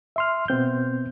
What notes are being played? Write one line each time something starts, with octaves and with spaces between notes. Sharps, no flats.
E5 C6 F6
B2 B3 C4 G6